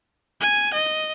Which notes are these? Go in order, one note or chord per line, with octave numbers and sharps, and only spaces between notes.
G#5
D#5